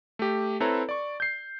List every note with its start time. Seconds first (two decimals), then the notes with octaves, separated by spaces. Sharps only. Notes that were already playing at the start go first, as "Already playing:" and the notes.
0.19 A3 G4
0.60 C4 E4 A4 B4 C#5 A#5
0.89 D5 C#6
1.20 G6 C7